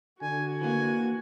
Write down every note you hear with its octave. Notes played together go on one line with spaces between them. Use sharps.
D3 F#4 G#5
E3 A#3 G#5